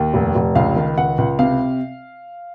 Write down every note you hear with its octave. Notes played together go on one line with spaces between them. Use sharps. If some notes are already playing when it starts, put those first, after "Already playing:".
Already playing: D#2
F1
F1
C#2 F5
D#3
C#2 F#5
C#2
C3 F5